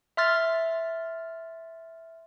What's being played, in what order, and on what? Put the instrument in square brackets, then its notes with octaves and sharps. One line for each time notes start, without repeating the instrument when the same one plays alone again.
[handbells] E5 C6 F6 A6